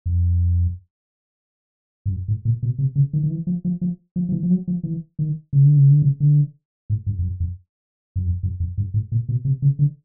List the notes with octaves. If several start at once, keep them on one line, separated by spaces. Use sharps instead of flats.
F2
G2
F#2
G#2
A#2
B2
C3
C#3
D#3
D#3
E3
F3
F3
F3
F3
F3
E3
F3
F#3
F3
E3
D#3
C#3
D3
C#3
D3
C#3
D3
G#2
G2
F2
F#2
F2
F#2
F2
F#2
F2
G2
G#2
A#2
B2
C3
C#3
D3